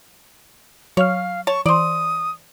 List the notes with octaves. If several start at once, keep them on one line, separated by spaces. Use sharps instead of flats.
F#3 C#5 F5 F6
C#5 A5 C#6
E3 C5 D5 D#6